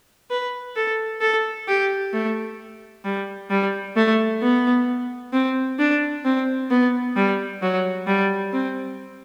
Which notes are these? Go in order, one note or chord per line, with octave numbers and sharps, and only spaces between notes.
B4
A4
A4
G4
A3
G3
G3
A3
B3
C4
D4
C4
B3
G3
F#3
G3
C4